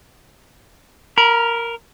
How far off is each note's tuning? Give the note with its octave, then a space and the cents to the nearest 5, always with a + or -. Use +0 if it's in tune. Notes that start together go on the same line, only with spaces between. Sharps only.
A#4 -5 B5 -40